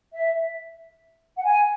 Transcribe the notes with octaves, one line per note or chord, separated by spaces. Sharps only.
E5
F#5
G#5